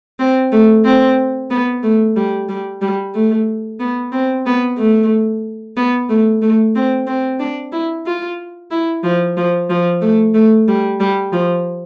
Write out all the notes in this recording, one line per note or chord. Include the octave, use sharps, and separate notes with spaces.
C4
A3
C4
B3
A3
G3
G3
G3
A3
B3
C4
B3
A3
B3
A3
A3
C4
C4
D4
E4
F4
E4
F3
F3
F3
A3
A3
G3
G3
F3